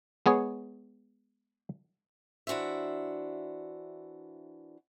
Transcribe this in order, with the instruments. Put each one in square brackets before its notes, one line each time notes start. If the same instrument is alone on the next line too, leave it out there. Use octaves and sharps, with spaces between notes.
[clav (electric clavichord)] G#3 B3 G#4 C#5
[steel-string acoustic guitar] E3 D4 F#4 C5 E5